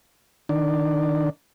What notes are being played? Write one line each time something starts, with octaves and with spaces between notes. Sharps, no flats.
D#3 D4